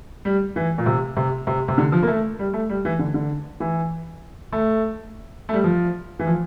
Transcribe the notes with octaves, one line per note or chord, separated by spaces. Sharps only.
G3
E3
A#2
C3
C3
C3
C3
D3
F3
A#3
A3
G3
A3
G3
E3
D3
D3
E3
A3
A3
G3
F3
E3
F3